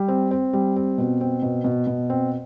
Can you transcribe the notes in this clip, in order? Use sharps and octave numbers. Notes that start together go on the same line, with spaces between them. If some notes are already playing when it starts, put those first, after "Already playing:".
Already playing: G3
C4
C4
G3
C4
B2
C4
B2
B2
B2
C4